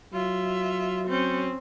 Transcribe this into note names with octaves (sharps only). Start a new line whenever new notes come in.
F#3 F4 E5
C4 C#4